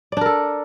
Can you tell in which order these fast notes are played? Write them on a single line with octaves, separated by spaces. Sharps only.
D5 D4 A#4 A4